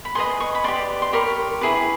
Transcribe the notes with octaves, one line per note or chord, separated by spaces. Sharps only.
B5
G#4 B4 D#5 C6
C#6
B5
G4 B4 D5 C6
C6
G4 A#4 C#5 B5
E4 G#4 B4